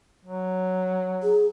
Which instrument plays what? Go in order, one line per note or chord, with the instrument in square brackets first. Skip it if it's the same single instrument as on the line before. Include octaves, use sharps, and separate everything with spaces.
[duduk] F#3
[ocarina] G#4